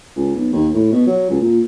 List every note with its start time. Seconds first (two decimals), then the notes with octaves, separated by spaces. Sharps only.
0.16 C#2
0.35 B1
0.52 D#2
0.74 A2
0.92 B2
1.06 F#3
1.30 C#2
1.42 A#2